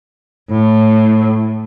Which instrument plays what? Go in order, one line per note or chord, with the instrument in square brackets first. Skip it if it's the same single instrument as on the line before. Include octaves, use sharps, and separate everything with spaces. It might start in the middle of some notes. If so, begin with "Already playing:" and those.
[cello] A2